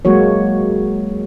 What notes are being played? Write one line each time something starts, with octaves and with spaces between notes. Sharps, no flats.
F#3 G#3 A#3 F#4 C#5